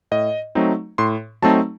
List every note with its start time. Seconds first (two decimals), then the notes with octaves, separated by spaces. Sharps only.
0.11 A2 D#5
0.55 F#3 A3 C4 D#4
0.98 A2 C6
1.42 F#3 A3 C4 D#4 A5